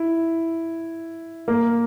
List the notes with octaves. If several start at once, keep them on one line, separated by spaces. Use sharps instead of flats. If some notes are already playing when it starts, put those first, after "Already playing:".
Already playing: E4
A#3